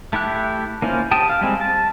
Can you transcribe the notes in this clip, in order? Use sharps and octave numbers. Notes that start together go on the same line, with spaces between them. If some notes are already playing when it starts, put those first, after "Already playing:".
A3 E4 G4 F#6
A#3 C#4 E4 F4 C5
G4 G5 A5 D#6
F5
G3 G#3 C4
A5